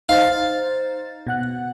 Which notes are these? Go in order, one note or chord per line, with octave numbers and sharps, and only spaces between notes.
D#4 C5 F5 A6
B2 F#5 F#6